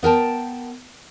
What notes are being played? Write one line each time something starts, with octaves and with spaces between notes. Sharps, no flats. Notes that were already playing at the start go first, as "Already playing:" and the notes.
B3 A#4 G5 A5